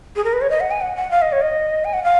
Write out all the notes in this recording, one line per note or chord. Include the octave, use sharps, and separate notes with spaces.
G#4
A#4
B4
C#5
D#5
F#5
G#5
F#5
F#5
F5
D#5
C#5
D#5
G#5
F#5
F5